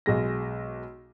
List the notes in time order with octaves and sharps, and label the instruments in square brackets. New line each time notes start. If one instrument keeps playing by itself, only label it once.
[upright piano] B1 G#3 A#6